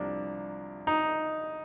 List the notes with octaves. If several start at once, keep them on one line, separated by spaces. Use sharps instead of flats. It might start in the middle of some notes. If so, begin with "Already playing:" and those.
Already playing: C2 C3 F3 A#3 D4
D#4